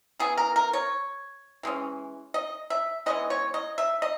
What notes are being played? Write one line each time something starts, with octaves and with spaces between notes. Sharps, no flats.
E3 B3 G#4
A#4
A#4
C#5
E3 G#3 C#4
D#5
E5
E3 G#3 B3 D#5
C#5
D#5
E5
D#5